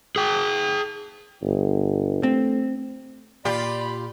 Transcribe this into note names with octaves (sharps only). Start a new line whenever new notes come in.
G#4 G5
G1
A3 C4
A#2 F4 G4 D5 B5